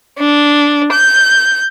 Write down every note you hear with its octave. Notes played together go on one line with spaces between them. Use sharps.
D4
G6